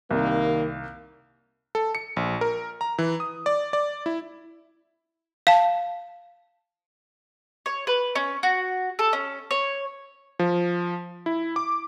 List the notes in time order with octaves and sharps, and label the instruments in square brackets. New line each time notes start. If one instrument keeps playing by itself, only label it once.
[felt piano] C2 [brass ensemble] D#3 G3 A#3
[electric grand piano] A4
C#7
A#1
A#4
A#5
E3
D#6
D5
D5
E4
[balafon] F5 A5
[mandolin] C#5
B4
C#4
F#4
A4
C#4
C#5
[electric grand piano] F3
E4
D6